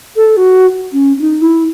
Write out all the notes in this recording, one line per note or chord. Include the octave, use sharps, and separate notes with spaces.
A4
F#4
C#4
C#4
D#4
E4